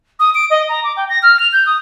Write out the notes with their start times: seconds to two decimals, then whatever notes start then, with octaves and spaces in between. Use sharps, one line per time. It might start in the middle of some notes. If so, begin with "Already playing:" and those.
0.20 D#6
0.35 D7
0.50 D#5
0.69 A#5
0.84 D6
0.97 G5
1.09 A#6
1.23 F6
1.40 F7
1.53 G6
1.66 D#6